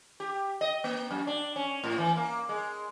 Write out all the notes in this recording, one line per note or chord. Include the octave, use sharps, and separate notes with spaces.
G4
D#5
A#3
F#2
D4
C#4
A2
E3
A#3
G#3